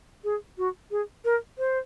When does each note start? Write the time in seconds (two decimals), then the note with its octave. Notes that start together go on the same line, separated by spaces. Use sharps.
0.24 G#4
0.58 F#4
0.91 G#4
1.25 A#4
1.58 C5